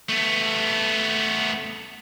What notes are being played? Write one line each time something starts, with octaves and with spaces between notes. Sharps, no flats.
A3 B3